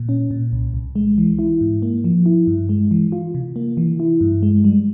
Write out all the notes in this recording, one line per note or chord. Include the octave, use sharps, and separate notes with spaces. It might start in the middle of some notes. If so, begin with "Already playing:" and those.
Already playing: A#2
C#4
A#2
C2
C2
G#3
E3
E4
G#2
A#3
F3
E4
G2
G#3
E3
F4
C3
A#3
E3
E4
G2
G#3
G3